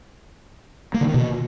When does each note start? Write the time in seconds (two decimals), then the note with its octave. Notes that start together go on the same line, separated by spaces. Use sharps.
0.94 A#3
1.01 D3
1.08 D#3
1.14 B2